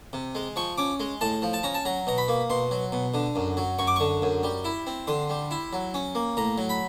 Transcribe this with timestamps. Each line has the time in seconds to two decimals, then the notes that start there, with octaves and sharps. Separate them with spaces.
0.13 C3
0.35 G#3
0.56 F3 C#6
0.78 C#4 D6
1.00 G#3
1.21 A2 A5
1.42 F3
1.53 A5
1.63 C#4 A#5
1.74 A5
1.85 F#3 A#5
2.07 B2 A#5
2.18 B5
2.28 A#3
2.50 B2 C6
2.71 F#3
2.92 B2
3.14 D3
3.36 F#2
3.57 F#3
3.79 F#2 C#6
3.87 D6
3.96 D3 C#6
4.22 F#2
4.43 G3
4.65 E4
4.87 C4
5.07 D3 C6
5.30 G3
5.51 E4
5.73 F#3
5.94 C#4
6.15 A#3
6.37 A2 A#5
6.58 F#3
6.69 B5